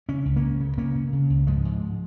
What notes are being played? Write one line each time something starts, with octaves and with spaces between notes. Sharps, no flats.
C#3 C#4
C#2
A#3 C#4
C#2
C#3
C#3 A#3 C#4
C#3
C#3
C#2
G#2 F3 G#3
G#2